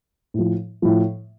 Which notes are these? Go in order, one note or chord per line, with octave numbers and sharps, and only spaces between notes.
A2 F3
A2 F3